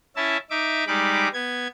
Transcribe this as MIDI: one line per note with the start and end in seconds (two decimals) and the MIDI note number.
0.16 0.37 61
0.16 0.37 64
0.16 0.37 76
0.16 0.37 81
0.50 0.84 63
0.50 0.84 76
0.50 0.84 86
0.87 1.28 55
0.87 1.28 56
0.87 1.28 63
0.87 1.28 83
0.87 1.28 86
1.33 1.67 59
1.33 1.67 92